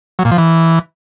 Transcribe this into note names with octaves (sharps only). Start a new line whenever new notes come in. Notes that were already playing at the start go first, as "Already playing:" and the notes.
F#3
A#2
F3
E3